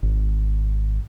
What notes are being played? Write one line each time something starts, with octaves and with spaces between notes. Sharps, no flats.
G#1